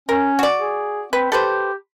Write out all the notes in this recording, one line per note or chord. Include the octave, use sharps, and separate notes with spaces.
C#4 A#4
F#4 D5
G#4
C4 B4
G4 A4 B4 C5